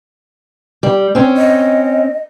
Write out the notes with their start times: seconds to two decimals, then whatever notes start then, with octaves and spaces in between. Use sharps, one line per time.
0.83 G3
1.15 C4 C#4
1.37 D#5